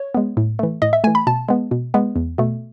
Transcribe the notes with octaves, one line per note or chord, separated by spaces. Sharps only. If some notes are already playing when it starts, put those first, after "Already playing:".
Already playing: C#5
G#3 B3
A2
E3 A3
A2 D#5
E5
E3 A3 G#5
B5
B2 A5
G#3 B3
B2
G#3 B3
E2
B2 A3